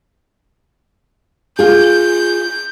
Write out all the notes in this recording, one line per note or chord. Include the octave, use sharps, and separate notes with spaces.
F4 G#4 G6